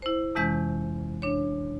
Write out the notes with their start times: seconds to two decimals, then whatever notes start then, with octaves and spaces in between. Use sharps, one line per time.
0.02 E4 C5
0.35 F2 C3 E3 G#3 C#4 G6
1.22 D4 C#5